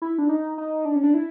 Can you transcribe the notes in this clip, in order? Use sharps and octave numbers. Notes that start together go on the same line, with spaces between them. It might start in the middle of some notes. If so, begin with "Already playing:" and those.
E4
D4
D#4
D#4
D4
C#4
D4
E4